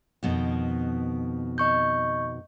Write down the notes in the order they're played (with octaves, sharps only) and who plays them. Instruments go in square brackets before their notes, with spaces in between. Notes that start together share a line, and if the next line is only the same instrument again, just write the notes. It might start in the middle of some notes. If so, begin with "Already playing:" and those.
[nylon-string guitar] F2 B2 D#3
[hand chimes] D#5 C#6 G6